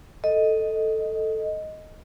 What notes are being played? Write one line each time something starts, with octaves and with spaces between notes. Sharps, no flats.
A4 D#5